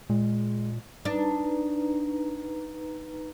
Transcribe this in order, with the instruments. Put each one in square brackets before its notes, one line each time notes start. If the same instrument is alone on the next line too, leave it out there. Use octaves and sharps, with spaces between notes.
[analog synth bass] A#2 [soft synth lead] G#3
[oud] D4 [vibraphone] D#4 B4 A#5